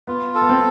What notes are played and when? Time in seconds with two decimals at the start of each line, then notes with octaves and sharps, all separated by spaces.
0.07 B3 F4
0.35 A4
0.42 B3
0.49 C4